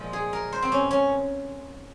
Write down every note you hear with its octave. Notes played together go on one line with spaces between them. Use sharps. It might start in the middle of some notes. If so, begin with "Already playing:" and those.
Already playing: A#2 F3 G#3
G#4
A#4
C5
C4
C#4
C#4